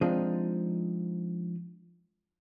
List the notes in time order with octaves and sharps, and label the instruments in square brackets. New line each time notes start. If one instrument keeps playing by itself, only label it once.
[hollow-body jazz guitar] F3 G#3 C4 D4 D#4